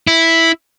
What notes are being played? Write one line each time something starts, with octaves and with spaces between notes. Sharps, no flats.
E4